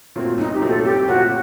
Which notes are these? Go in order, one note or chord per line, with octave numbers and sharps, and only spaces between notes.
A#2 F#3 A3 C4
C2 D#4
G4
A#2 F#3 A3 C4
A4
C2 G4
A#2 F#3 A3 C4 F#4